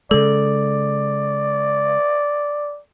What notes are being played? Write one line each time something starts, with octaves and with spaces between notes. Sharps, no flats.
C#3 G#3 A4 D5